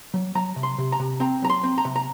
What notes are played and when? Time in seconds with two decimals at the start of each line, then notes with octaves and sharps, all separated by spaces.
0.14 F#3
0.35 F#3 A#5
0.56 C3
0.63 C6
0.78 C3
0.92 A#5
1.00 C3
1.20 C4 A#5
1.42 F#3 A#5
1.49 C6
1.64 C4
1.78 A#5
1.85 C3
1.96 A#5